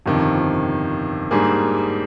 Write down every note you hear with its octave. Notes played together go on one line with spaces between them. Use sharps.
G1 F2 C3 D#3
G#2 G3 A#3 D4 G#4